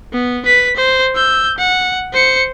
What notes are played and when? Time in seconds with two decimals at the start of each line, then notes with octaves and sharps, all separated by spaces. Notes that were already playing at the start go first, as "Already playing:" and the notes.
0.12 B3
0.45 B4 B6
0.76 C5
1.15 E6 G6
1.58 F#5
2.13 C5 C#7